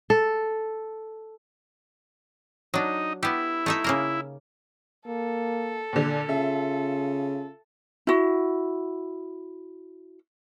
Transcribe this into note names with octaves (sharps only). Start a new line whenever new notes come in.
A4
F#3 D4 D#4
B3 E4 G4
A3 D#4 E5
C#3 A#3 A#4
A#3 A4
A#2 D3
C#3 F4 E5
E4 F#4